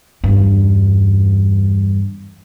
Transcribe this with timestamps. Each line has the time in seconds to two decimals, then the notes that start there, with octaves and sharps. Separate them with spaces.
0.24 E2 G2